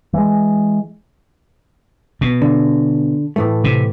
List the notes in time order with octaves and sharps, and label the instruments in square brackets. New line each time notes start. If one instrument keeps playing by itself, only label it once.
[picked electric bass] E3 G#3
[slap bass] B2
[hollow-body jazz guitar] D3
A2 E3 A3
[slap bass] C3